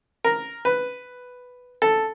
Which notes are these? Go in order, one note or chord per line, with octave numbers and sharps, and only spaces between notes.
A#4
B4
A4